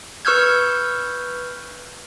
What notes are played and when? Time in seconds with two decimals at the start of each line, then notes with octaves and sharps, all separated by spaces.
0.25 B4 C#6 E6 F6 G6 G#6